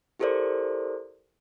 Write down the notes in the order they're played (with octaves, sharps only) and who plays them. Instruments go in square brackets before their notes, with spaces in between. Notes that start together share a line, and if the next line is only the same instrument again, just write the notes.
[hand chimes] E4 G4 A4 A#4 C5 D5